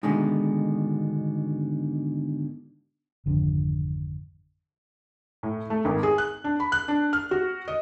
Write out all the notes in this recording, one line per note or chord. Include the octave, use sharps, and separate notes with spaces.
G#2 B2 D3 D#3 G#3 A3
G#1 F2 D3
A2
A3
G#1
G#4
F#6
D4
B5
F#6
D4
F6
F#4
D#5